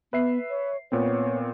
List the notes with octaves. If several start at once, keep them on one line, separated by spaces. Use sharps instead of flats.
B3 B4 E5 C7
C#5
A#2 B3 C4 C#5